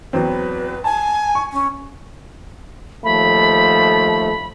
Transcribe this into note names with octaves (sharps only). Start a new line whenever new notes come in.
E2 F#3 C4 B4
G#5 A5
C#6
C#4
D#2 F3 A3 B5